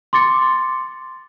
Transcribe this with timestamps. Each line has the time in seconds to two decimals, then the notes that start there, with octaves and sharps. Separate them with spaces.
0.13 C6 D6 A6 C#7